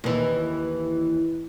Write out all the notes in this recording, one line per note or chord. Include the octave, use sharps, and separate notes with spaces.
D#2 E3